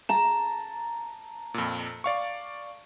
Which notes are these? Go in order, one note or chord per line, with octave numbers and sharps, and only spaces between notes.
A5 A#5 E7
F2 A#2
D5 F5 C#6